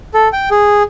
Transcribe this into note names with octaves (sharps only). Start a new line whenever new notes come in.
A4
G5
G#4